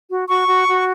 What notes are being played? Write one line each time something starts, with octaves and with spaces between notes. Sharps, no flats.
F#4
F#4 C#6
F#4
F#4